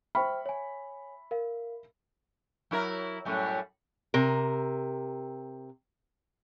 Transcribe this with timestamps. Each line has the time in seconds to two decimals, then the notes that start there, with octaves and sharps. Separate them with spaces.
0.15 C5 E5 G5 B5 C#6 F6
0.46 C#5 G#5
1.31 A#4 F5
2.71 F#3 E4 A#4
3.25 F#2 A2 G3
4.14 C3 A#4